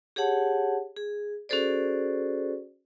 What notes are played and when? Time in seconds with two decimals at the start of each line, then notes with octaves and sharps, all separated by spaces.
0.16 G4 G#4 C#5 F#5 A5
0.96 G#4
1.49 C#4 F#4 G#4 A4 C5 D5